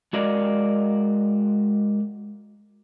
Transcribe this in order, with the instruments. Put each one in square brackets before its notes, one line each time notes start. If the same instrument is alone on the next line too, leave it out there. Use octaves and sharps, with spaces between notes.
[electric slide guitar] G#3 F#4 A#4 D5 D#5 F5